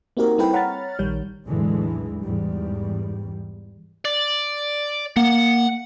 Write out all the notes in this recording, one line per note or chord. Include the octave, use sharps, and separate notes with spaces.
A#3 C4 D#4 F#4 G4 A#4
G3 C4 E4 A4 B4 G5
C#5 F#5 A#5 B5 F6 A6
A#1 D#3 G3 C#5 G6
B1 E2 A2 D3 E3 G#3
E2 G#2 G3
D5
A#3 F#5